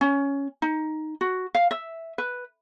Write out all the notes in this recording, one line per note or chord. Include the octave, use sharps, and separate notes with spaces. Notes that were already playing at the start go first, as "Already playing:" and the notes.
C#4
D#4
F#4
F5
E5
B4